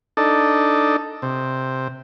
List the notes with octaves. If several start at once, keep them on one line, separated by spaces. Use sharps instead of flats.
D4 D#4 A4
C3